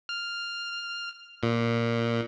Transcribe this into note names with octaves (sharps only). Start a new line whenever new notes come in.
F6
A#2